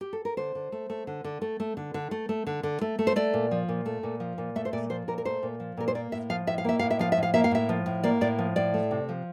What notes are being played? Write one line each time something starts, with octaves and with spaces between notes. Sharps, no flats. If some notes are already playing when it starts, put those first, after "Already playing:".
G4
A4
A#4
D3 C5
D3
A3
A3
D3
D3
A3
A3
D3
D3
A3
A3
D3
D3
A3
A3
C5
A3 D5
A#2
F3
A#2
A3
A#2
F3
A#2
A3 E5
C5
A#2 D5
F3 C5
A#2 A#4
A#4
A3 C5
A#2
F3
A#2 A#4
C5
A#3 D5
A2 E5
F3 F5
A2 E5
F5
A#3 E5
A2 F5
E5
F3 F5
A2 E5
F5
A#3 E5
F5
A2 E5
F3
A2
A#3 D5
A2 D5
F3
A2 D5
A3
C3
F3